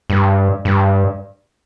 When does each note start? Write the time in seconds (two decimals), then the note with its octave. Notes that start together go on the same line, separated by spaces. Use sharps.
0.10 G2
0.65 G2